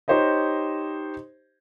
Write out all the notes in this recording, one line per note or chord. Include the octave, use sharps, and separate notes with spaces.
D#4 G4 C5 C#5 D#5